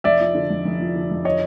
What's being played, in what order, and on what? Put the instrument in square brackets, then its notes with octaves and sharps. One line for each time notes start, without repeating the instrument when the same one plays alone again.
[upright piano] F1 [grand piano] D5 E5
[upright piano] F3
D3
F2
F1
F3
D3
F2
[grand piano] C#5 D#5